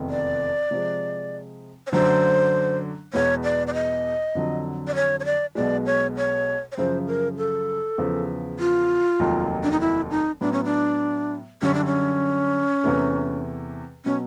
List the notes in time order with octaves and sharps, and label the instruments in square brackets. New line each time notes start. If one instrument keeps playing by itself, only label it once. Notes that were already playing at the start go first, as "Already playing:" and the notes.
Already playing: [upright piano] F1 E2 C3 D#3
[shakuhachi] D5
[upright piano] C3 F3 G#3
[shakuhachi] C#5
[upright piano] F#2 D3 F#3 A3 D4 [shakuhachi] C5
[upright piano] E2 B2 G#3 B3 [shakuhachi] C#5
[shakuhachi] D5
D5
D#5
[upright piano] F2 D3 F#3
[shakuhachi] D5
C#5
C#5
D5
[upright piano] B1 B2 G#3 [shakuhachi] D5
[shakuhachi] C#5
C#5
C#5
[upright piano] F#2 C#3 F3 [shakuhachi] C5
[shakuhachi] A#4
A4
[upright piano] E2 C#3 F3
[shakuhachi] F4
[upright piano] F1 D#2 D#3 F#3
[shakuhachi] D4
D#4
E4
D#4
[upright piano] A2 F#3 B3 [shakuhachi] D4
[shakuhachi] C#4
D4
[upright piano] F#2 D3 G3 [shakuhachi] C#4
[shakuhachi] D4
C#4
[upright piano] E2 C3 E3 A3
[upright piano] B2 F#3 [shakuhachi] C#4